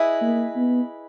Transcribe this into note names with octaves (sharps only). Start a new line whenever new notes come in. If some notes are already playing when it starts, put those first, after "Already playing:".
Already playing: E4 G#4 B4 D#5
A#3
B3